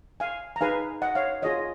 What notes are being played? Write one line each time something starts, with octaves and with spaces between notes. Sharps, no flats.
F5 G#5
A#5
D#4 G#4 B4 F5 G#5
D#5 F#5
C#5 F5
F4 G#4 C#5 D#5